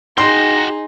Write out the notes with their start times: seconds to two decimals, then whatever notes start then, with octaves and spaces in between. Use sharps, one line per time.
0.18 D#4 F#4 G#4 G5 A#5 C6